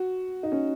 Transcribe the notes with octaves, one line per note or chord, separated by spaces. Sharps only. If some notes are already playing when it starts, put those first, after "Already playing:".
Already playing: F#4
D#4
C#4